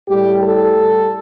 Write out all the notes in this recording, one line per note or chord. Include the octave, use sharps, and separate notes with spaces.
A2 G3 G4
A4